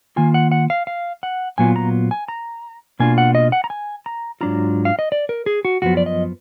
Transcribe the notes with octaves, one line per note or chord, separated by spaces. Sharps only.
D#3 A#3 F4 G#5
F#5
F#5
F5
F5
F#5
A#2 F#3 B3 F4 G#5
A#5
G#5
A#5
B2 A#3 D4 F4 G#5
F#5
D#5
F#5
A#5
G#5
A#5
G#2 F#3 D4 F4 A#5
F5
D#5
D5
A#4
G#4
F#4
F#2 F3 B3 F#4
D5
D#5